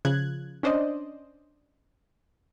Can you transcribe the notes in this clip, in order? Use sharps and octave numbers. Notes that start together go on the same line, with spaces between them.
C#3 F3 F#6 G#6
C#4 D4 C5 D5 D#5